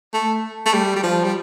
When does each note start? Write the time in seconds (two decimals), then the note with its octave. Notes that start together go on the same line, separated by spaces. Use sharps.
0.14 A3
0.66 A3
0.73 G3
0.96 G3
1.03 F3
1.24 G3